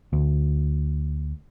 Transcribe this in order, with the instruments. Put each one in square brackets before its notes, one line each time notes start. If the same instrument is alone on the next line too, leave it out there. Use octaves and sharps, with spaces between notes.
[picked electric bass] D2